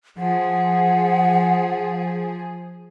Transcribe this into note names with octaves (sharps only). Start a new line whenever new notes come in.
F3 G#4 F#5